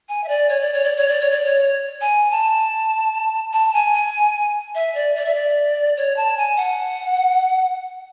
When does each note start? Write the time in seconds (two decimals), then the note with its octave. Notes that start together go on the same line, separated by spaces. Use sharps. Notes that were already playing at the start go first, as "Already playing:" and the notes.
0.09 G#5
0.24 E5
0.29 D5
0.49 C#5
0.61 D5
0.73 C#5
0.84 D5
0.97 C#5
1.08 D5
1.20 C#5
1.32 D5
1.45 C#5
2.01 G#5
2.31 A5
3.53 A5
3.74 G#5
3.93 G#5
4.75 E5
4.94 D5
5.16 D5
5.25 E5
5.34 D5
5.97 C#5
6.16 A5
6.37 G#5
6.57 F#5